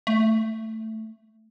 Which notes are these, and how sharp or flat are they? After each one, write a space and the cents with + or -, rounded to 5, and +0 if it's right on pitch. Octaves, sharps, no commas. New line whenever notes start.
A3 +10